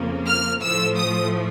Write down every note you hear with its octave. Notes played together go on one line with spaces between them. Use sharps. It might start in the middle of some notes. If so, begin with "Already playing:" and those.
Already playing: F2 C#3 F3 A#3
F6
A2 F3 A3 E6
D#6